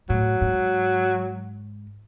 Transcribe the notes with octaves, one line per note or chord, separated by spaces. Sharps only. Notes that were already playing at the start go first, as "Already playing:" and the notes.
A2 F#3
G#2